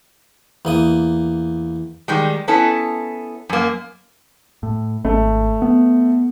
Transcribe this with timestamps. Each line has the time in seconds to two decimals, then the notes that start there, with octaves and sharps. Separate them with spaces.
0.65 E2 A#3 D#6
2.08 D#3 G3 G#3
2.48 B3 C#4 E4 A4
3.49 F#2 A#3
4.63 A2
5.05 G#1 A3
5.62 B3